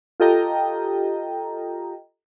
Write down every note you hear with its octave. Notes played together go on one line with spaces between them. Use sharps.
F4 G4 A4 D#5 G5 A#5